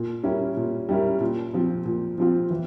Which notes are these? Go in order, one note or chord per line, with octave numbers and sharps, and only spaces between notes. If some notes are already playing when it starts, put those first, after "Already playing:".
Already playing: A#2
G3 C#4 E4 A#4
A#2
G3 C#4 E4 A#4
A#2
F3 C4 F4
A#2
F3 C4 F4
E3